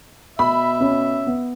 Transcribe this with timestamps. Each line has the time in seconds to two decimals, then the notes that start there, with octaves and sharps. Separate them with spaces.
0.39 B2 E5 B5
0.81 C#4
1.27 B3